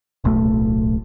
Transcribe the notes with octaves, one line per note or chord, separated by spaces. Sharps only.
D1 B1 A2 A3